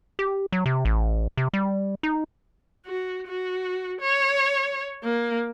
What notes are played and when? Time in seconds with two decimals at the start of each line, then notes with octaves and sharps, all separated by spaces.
0.19 G4
0.52 F#3
0.66 C3
0.85 A1
1.37 C3
1.54 G3
2.03 D#4
2.86 F#4
3.27 F#4
4.01 C#5
5.03 A#3